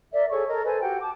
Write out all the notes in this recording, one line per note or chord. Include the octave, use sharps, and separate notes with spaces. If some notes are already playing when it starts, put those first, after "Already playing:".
A#4 D5 E5
G#4 A4 C#5 C#6
A4 A#4 D#5
A4 B4 C5 G#5
F#4 G4 F#5 G5
A5 D6